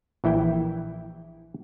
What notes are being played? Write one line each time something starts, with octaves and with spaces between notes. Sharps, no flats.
A#1 E3 E4 G5